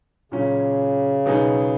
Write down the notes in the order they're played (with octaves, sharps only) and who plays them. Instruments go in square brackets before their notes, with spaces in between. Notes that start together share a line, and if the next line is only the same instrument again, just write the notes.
[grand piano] A#2 F#3 C#4 F#4 [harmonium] C#3
[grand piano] B2 F#3 B3 D#4 G#4